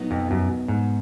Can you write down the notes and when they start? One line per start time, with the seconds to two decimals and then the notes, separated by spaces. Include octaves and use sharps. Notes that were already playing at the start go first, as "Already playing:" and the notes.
Already playing: B2 F#3 B3 D#4
0.11 F2
0.31 F#2
0.68 G#2